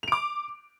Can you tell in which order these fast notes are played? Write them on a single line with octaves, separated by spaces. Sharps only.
F7 D7 D6